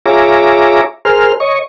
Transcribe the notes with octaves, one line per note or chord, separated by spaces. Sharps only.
F4 G#4 C#5 E5 A#5 D6
G#4 A#4 C5 F6
C#5 D#5 C#6